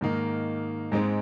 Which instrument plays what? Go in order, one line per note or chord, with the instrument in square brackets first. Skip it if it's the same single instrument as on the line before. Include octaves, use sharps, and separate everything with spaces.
[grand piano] G#2 D#3 A#3 D#4
G#2 G#3 C4 D#4